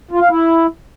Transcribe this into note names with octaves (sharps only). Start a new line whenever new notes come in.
F4
F5
E4